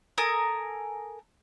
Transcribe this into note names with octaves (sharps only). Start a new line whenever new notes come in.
A4 A#4 G#5 D#6